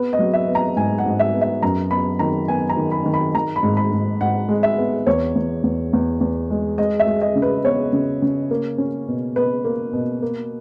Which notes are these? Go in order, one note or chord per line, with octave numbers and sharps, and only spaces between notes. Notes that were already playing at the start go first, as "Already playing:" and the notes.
Already playing: B3 B4
D#5
F#3
E5
B3
A#5
G#2 G#5
F#5
G#2
E5
B3
E5
F#2 A#5
B3 B5
D#3 A#5
B3 G#5
A#5
D#3
B5
D#3
B5
D#3 A#5
B5
G#2
B5
G#2
G#2 F#5
G#3
E5
B3
E2 C#5
E2
E2
E2
E2
G#3
G#3 D#5
E5
G#3
D#5
C#3
B4
B3 C#5
C#3
C#3
A#3
C#4
B2
B2 B4
A#3
B2
A#3